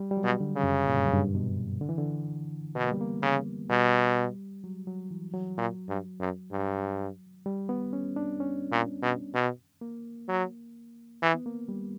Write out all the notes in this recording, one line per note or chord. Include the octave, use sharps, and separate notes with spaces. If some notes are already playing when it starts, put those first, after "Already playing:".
Already playing: G3
G3
F#3
B2
D3
C#3
F#2
A#2
G2
F#2
G2
B2
D3
E3
D3
B2 B3
A#3
G3
A#3
C#3
B2 G3
F#3
F#3
E3
F#3
A#2
G2
F#2
G2
G3
B3
C#4
D4
C#4
A#2
B2
B2
A#3
F#3
E3
B3
A#3
G3